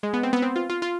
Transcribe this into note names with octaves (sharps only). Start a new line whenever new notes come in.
G#3
B3
C4
B3
C4
F4
F4
F4